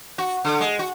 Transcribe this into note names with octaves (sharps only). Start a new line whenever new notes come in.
F#4
D3
G#3
F#4